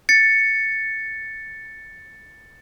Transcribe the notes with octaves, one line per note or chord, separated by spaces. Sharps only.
A6 C#7